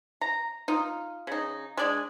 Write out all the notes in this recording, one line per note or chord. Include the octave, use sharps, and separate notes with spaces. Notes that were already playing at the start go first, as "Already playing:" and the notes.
A#5
D#4 F4
C#3 D#4
G#3 D4 D5 G#5